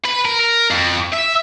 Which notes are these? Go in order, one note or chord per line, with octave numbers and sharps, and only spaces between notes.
B4
A#4
A#4
F2
E5